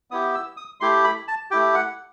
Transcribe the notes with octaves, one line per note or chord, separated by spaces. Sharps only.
B3 E4 G4 D#6
E6
D#6
A3 E4 G4 C6
B5
A5
A3 E4 G4 G5
F#5